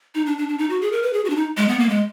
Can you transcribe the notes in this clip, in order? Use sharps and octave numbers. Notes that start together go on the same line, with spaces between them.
D#4
D4
D4
D4
D#4
F#4
G#4
A#4
B4
G#4
F#4
D4
D#4
G#3
B3
A#3
G#3